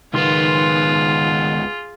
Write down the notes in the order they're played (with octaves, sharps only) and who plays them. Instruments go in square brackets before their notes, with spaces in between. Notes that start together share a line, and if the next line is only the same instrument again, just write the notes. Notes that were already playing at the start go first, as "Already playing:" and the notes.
[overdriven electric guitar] C#2 B3 [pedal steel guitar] D#3 C6 [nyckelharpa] F4 G#4